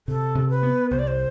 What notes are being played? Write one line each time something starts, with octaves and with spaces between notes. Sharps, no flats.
C3 A4
C3
B4
B3
C2 C5
D5
C5